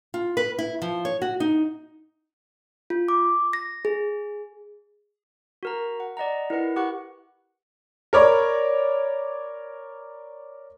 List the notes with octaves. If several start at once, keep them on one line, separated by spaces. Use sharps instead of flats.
F4
B4
E4
F3
C#5
F#4
D#4
F4
D6
A#6
G#4
F#4 A#4 A#5
F#5
D5 D#5 F#5 A#5
E4 A#4 B4 F#5
G4 F#5 C#6 F#6
A#4 C#5 D5 B5